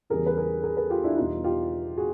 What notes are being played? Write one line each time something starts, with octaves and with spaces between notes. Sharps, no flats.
E2 C#3 E3 G3 G#4 A#4
B4
G#4 A#4
G#4 A#4
A4 B4
F4 G4
D4 E4
E2 B2 G3 D#4 F4
F4 G4
F#4 G#4